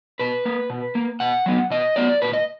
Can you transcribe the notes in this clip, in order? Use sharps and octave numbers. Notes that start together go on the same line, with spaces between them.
B2 B4
A#3
B2
A#3
B2 F#5
F#3 B3
B2 D#5
F#3 B3 D5
A#2 B4
D#5